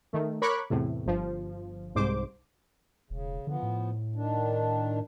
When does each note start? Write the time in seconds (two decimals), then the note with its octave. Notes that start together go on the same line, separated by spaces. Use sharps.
0.13 D#3 A3
0.42 A#4 C#5 B5 C#6 D6 F#6
0.70 E2 A2 C3
1.06 G1 F3
1.95 C2 G#2 C5 D6
3.10 E1 C#3
3.47 D3 F3 B3
3.63 A2
4.15 D#3 D4